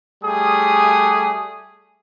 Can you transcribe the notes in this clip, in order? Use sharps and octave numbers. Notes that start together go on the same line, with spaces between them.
G3 A3 G#4 D#6